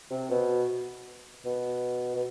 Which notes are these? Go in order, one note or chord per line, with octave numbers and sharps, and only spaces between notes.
C3
B2
B2
B2